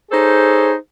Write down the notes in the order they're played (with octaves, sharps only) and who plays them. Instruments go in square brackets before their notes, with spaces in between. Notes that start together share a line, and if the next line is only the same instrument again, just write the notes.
[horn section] D#4 G#4 A4 C5 C#5